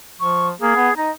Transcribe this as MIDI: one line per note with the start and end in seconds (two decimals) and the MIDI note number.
0.20 0.52 53
0.20 0.48 85
0.60 0.75 58
0.60 0.94 68
0.76 0.89 59
0.97 1.10 63
0.97 1.10 75